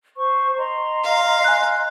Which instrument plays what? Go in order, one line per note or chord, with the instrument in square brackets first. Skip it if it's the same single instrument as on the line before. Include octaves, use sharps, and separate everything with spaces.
[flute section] C5 C#6
D#5 A#5 C6
[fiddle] F5
[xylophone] G#5 F#6